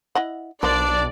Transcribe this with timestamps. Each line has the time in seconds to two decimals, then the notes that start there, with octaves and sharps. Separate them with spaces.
0.15 E4 D#5 F#5
0.63 B1 F3 A#3 D4 C5 D5